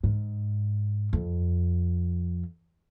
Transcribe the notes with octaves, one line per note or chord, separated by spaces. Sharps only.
G#2
F2